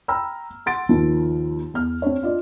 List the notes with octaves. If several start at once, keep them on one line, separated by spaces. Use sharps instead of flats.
G5 A#5 B5 E6 F6
F#5 C6 A6 D7
D#2 D#3 F3
E2 F6
C4 D4 C#5
D4 F4 D5 D#5